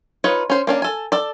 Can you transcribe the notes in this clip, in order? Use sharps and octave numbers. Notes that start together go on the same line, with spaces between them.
D#4 F4 B4 C#5
C#4 C5
A#3 C#4 D4
A4 G#5
A4 D5